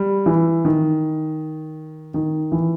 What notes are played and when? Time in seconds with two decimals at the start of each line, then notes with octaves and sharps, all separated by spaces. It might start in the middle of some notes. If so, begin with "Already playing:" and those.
Already playing: G3
0.26 E3
0.65 D#3
2.14 D#3
2.52 E3